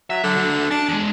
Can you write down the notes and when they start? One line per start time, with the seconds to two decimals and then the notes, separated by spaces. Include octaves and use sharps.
0.10 F#3 E5
0.24 D3 F#3
0.37 D4 F#4
0.71 D4 A5
0.89 E2 G#3